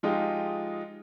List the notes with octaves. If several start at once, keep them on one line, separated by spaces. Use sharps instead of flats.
F3 G#3 D#4 F4 G4